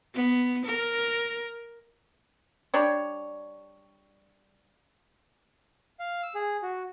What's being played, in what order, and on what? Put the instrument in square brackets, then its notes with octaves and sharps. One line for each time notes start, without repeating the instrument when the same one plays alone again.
[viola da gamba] B3
A#4
[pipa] G3 D4 C#5
[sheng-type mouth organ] F5
E6
G#4
F#4